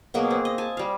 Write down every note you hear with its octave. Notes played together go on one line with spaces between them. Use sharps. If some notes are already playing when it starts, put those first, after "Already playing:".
B2 F#3 A#3 G#4
C4
D#5
G#5 A5
G3 F5